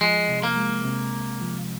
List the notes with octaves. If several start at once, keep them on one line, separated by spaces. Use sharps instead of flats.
F3 G#3
C3
A#3
G#3
C3
C2
F3